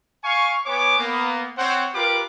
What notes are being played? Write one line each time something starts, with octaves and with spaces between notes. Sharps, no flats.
F5 G#5 C#6
B3 C#5 G#5 D6
A#3 B3
C4 C5 C#5 F#5
F4 G4 A#4 B4 D6